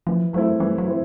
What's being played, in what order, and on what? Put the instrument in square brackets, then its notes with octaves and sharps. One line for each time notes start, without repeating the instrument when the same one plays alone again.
[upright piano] E3 [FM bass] F3
[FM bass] F#3 [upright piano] A3 C4 E4
[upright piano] E3 [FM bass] G3
[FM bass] F#3
[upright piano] C4 E4